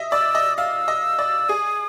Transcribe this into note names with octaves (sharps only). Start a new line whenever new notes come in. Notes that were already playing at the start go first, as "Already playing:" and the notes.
Already playing: D#5 E5
D5 E6
D#5
F5 E6
D#5
D5
G#4 D#6